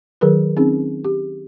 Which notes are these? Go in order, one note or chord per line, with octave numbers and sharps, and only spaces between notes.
D#3 F#3 G#4 A#4 B4
C4 C#4 D#4 G#4
G4